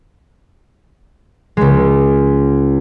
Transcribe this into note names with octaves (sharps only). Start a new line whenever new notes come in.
C#2 G#3